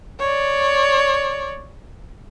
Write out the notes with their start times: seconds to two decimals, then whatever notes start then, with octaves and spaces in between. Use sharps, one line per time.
0.20 C#5 D5